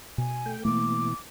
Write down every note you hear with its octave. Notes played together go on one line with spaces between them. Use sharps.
B2 G#5
A3 G5
B2 E3 A3 A#3 D6